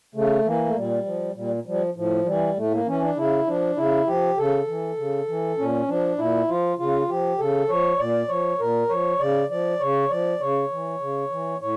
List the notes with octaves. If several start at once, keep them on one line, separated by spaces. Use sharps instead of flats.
C#3 A3
E3 A#3
A3
A#2 G3
F3
A#2 G3
F3 G3
A2 F3
E3 G3
A2 A3
A#3
E3 C#4
D4
C#3 E4
F3 D4
C#3 E4
F3 G4
C#3 A4
E3
C#3
E3
A#2 C#4
F3 D4
A#2 E4
F3 F4
C#3 F4
F3 G4
C#3 A4
F3 C#5
A#2 D5
F3 C#5
A#2 A#4
F3 C#5
C#3 D5
F3 D5
C#3 C#5
F3 D5
C#3 C#5
E3
C#3
E3
A2 C#5